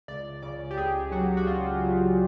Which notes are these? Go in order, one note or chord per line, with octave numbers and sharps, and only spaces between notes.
C#2 D5
C#3 D5
G4
C#2 G#4
F#3 F#4
F#4
C#2 F4
C#3